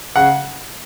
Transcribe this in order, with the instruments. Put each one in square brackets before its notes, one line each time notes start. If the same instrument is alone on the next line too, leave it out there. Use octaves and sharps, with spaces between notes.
[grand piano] C#3 F#5